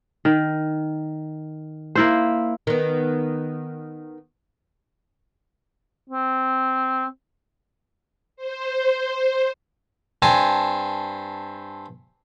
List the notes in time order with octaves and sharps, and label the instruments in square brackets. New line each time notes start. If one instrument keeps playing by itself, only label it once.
[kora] D#3
A#3 E4 C5
[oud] D#3 B3
[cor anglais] C4
[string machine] C5
[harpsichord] G2 C4 G#5 A5